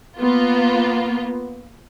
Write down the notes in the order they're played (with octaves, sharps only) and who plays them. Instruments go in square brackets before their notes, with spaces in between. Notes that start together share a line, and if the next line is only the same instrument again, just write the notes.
[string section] A#3 B3 F4